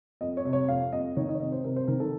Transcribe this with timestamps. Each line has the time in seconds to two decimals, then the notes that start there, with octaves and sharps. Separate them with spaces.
0.21 F2 D#5
0.37 C#5
0.45 C3
0.53 C#5
0.68 F2 F5
0.92 F2 D#5
1.17 D#3 C#5
1.29 D#5
1.35 C#5
1.40 C3 D#5
1.52 C5
1.64 C3 A#4
1.76 C5
1.88 D#3 A#4
2.00 A4